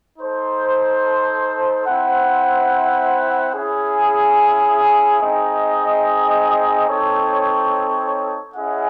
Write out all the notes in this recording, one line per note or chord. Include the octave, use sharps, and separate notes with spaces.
D#4 A4 C5
C4 E4 C5 F#5
C#4 E4 G#4
C4 D#4 G#4 D#5
C4 D#4 A4 C#5
C#4 E4 G#4 D#5 F#5